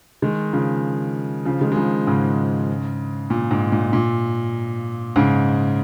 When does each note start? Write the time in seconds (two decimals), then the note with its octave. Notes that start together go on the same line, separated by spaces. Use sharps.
0.22 D#3 G#3
0.53 C#3 F3
1.45 C#3 F3
1.61 D#3 G#3
1.72 G#3
1.76 C#3 F3
2.07 G#2 C#3
3.30 A#2
3.51 G#2
3.72 A#2
3.93 A#2
5.16 G#2 C#3